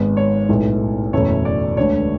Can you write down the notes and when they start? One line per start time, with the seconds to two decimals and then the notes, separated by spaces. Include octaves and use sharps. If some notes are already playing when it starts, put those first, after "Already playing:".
Already playing: G#1 G#2 G#3 B3
0.17 C#5
0.49 B1 A2 G#3 B3
1.13 F#1 E2 B2 A3 C#5
1.45 D5
1.77 E1 D2 D3 A3 C#5